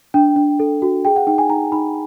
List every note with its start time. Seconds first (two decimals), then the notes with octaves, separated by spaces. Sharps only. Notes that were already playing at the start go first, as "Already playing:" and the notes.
0.14 D4 G5
0.36 D4
0.59 A4
0.82 F#4
1.05 G#4 G5
1.16 F#5
1.27 D#4 G5
1.38 G#5
1.49 D#4 A#5
1.72 D#4 B5